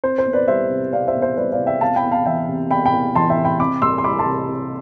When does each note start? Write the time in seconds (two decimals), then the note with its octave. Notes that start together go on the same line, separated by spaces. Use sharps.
0.04 C4 C5
0.18 C5
0.26 E2
0.33 B4 D5
0.48 G3 C5 E5
0.70 C3
0.93 C4 D5 F5
1.08 C5 E5
1.15 E2
1.22 C5 E5
1.37 G3 B4 D5
1.52 D5 F5
1.59 C3
1.66 E5 G5
1.81 E2 F5 A5
1.96 G5 B5
2.04 E2
2.12 F5 A5
2.26 E3 E5 G5
2.49 C3
2.70 E2 G5 B5
2.85 G5 B5
2.93 E2
3.15 E3 A5 C6
3.30 E5 G5
3.37 C3
3.45 G5 B5
3.60 C4 B5 D6
3.82 C2 C6 E6
3.98 C6
4.04 G3 B5 D6
4.19 A5 C6
4.26 C3
4.48 C4